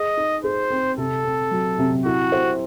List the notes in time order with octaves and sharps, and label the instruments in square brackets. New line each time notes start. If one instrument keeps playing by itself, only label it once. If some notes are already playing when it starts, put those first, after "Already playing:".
Already playing: [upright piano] G#4 [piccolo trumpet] D#5
[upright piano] D#4
[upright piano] G#4 [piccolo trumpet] C5
[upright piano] C4
[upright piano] C3 [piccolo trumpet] A4
[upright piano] C4
F#3
C3
[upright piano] E4 [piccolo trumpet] F#4
[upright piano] C5